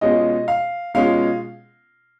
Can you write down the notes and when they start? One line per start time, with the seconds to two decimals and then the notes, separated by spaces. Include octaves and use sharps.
0.01 B2 G#3 C#4 F4 D#5
0.48 F5
0.94 B2 G#3 C#4 F4 F5